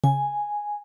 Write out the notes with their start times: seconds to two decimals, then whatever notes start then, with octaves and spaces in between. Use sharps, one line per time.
0.04 C#3 G#5